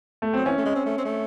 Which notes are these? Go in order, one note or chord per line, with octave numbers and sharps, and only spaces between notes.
A3
F#3 C4
E3 C#4
A3
G#3
C4
A3
C4
A3